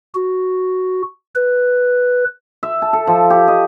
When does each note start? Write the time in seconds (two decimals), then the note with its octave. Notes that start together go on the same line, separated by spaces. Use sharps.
0.14 F#4
1.35 B4
2.63 E5
2.82 A5
2.93 A4
3.07 F3
3.30 G4
3.48 D#5